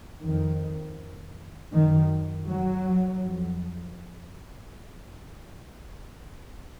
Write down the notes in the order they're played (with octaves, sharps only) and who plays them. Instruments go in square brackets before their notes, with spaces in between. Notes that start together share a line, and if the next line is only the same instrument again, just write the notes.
[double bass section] F2 D#3
F#2 D#3
F#3
F2